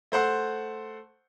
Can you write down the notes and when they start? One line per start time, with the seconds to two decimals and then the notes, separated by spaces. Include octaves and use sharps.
0.12 A3 C5 F#5 C6